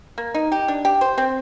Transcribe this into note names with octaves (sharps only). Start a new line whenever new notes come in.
A#3
D#4
G4
D4
G4
C5
C4